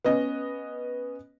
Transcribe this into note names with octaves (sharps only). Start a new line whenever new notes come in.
B3 C#4 D#5